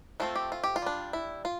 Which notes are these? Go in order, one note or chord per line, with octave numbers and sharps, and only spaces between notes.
F3 A3 C4 F4
G4
F4
G4
F4
G3 D4
E4
F4